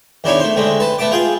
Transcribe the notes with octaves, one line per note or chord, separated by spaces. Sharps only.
E2 D#3 D4 E4 C#5
A3 C5
D3 G#3 A3 C4
B4 A5
A3 B3 A5 D6
F4 G#4 G5